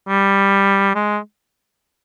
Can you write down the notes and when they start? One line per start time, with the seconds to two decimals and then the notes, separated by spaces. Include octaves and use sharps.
0.08 G3
0.95 G#3